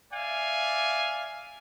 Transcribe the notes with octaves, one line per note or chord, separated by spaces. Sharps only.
D5 E5 F5 G#5